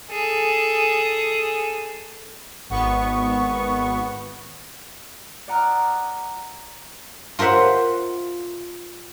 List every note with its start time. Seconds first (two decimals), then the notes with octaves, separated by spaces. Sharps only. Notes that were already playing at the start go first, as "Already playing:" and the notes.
0.10 G#4 A4
2.70 G#1 B3 C#6
5.48 D5 F#5 A#5 D#6 F6 F#6
7.39 F4 A#4 C5 E5 F#5